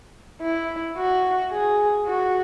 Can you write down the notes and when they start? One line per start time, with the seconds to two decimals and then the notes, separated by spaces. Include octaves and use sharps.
0.41 E4
0.97 F#4
1.52 G#4
2.07 F#4